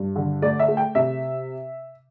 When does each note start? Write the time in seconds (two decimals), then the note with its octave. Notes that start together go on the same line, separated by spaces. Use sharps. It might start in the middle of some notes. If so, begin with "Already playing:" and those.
Already playing: G2
0.16 D3
0.42 A3 D5
0.59 E5
0.68 A3
0.77 G5
0.95 C3 E5